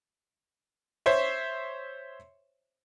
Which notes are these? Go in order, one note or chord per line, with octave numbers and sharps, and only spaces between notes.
C5 C#5 E5